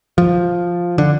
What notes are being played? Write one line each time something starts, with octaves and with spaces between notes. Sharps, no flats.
F3
D3